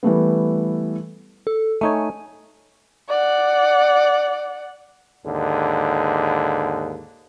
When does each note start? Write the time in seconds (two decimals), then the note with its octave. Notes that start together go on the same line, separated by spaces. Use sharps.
0.03 E3 G3 A3 B3
1.47 A4
1.81 A3 D#4 C#5 G#5
3.08 D5 F#5
5.26 D#2 G#2 D3